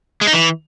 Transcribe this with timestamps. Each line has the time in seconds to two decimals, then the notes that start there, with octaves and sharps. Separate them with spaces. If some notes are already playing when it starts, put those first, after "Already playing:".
0.21 G#3
0.27 D#4
0.33 E3